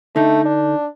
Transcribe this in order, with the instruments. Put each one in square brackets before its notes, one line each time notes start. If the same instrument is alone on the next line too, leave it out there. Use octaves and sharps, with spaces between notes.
[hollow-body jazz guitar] D3 D#4 [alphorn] A3
[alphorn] D4